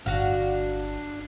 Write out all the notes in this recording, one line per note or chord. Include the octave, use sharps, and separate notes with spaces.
G1 D4 F#4 F5